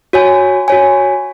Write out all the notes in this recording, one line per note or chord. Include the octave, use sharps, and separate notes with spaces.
F#4 C#5 G#5
F#4 C#5 G#5